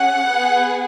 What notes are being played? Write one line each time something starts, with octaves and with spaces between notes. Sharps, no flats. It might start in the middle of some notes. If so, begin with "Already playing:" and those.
Already playing: C#4 G#4 F#5
B3 G#4